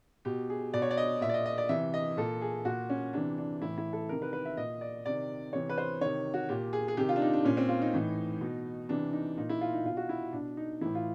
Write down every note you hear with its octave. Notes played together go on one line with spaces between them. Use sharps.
B2 G4
G#4
B2 D5
C#5
D5
D#5
A#2 E5
D5
D#5
D#5
D5
C3 E3 E5
D#5
A#2 A4
G#4
A#2 F#4
C#4
C3 E3 D4
D4
A2 E3 E4
E4
A4
C3 D#3 A#4
B4
B4
E5
A#2 D#5
D5
C3 D#3 D5
C3 E3 C#5
B4
C5
C3 D#3 C#5
F#4
A#2 G4
G#4
G#4
C3 D#3 G4
F4
D4
D#4
D4
A#2 C#4
C4
F4
D#4
A2 E3
B2
C3 E3 D4
D#4
A#2 D#4
E4
F4
D#4
B2 F4
F#4
E4
B2 D4
D#4
A2 E3 E4
F4